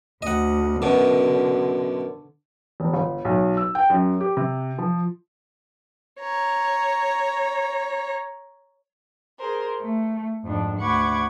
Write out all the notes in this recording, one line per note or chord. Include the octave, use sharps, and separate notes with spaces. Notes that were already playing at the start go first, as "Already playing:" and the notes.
D2 D#5 F#5
F#2 B2 D3
E1
G1
B1
E6
G5
F#2
G4
C3
F3
C#5 A#5
G#4 A#4 C5
A3
F2 G#2 D4
D2 F#5 B5 C#6 D6 G#6